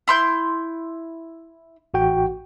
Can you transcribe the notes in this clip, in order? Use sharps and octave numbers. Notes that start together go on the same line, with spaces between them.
E4 C6 G6
A1 F#4 G5